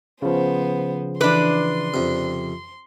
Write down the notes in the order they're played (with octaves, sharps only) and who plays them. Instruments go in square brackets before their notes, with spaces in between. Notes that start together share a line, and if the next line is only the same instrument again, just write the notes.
[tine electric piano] C#3 F3 [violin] B3 C5
[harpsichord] E3 [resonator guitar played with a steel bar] D4 B4 [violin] C6
[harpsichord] F2 C3